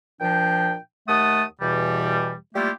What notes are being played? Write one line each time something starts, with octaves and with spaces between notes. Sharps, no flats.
A#2 F3 D4 G5
D#2 A3 F#5 A5 D#6
E2 B2 E3 G3
G3 A3 A#3 E4 F4 G4